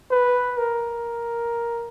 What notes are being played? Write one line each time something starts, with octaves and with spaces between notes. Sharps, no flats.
B4
A#4